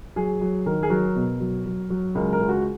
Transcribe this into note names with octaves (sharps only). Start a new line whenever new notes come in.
F#3 G#4
F#3
D#3 A#4
G#4
F#3 A#4
B2
F#3
F#3
F#3
C#2 A#4
A#4
C#2
F#4